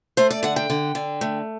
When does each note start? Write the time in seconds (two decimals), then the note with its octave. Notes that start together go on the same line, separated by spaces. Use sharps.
0.17 A3 C5
0.31 D5
0.43 D3 F#5
0.56 G5
0.70 D3
0.95 D3
1.21 A3